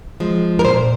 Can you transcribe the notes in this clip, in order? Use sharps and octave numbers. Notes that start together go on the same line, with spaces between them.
F3 G#3
A#4
A#2 C5